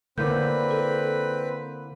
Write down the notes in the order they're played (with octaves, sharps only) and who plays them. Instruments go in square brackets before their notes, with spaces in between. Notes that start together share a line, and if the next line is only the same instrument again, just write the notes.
[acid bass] D3 [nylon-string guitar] A#3 E4 D5 [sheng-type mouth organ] C4 B4 B5 [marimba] G6
[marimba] A4